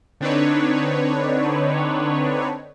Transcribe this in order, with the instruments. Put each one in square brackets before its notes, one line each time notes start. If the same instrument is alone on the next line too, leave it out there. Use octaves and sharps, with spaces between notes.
[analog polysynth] D3 C4 D4 D#4 B4 C#5